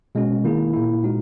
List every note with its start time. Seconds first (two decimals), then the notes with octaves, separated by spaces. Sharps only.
0.15 B2 G#3 C#4 F#4
0.44 D#3 A#3 E4 G#4
0.73 A#2 A#3 E4
1.02 A#2 G#3 D#4 F#4